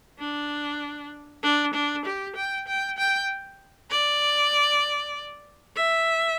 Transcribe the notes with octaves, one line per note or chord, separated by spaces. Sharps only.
D4
D4
D4
G4
G5
G5
G5
D5
E5